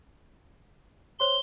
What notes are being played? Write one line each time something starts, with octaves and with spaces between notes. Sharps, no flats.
C5 C#5 C6 G7